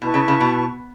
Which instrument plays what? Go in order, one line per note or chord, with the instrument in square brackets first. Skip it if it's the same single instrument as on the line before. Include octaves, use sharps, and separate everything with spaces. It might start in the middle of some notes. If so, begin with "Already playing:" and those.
[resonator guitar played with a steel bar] B2 [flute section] E4 B4 A5 C#6
[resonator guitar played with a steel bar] C#3
C#3
B2